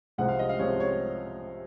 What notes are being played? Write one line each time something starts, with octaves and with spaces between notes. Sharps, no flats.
C2 C3 F3 G#3 C4 F#5
F5
D#5
F5
C2 C3 F3 G#3 C4 C#5
C#5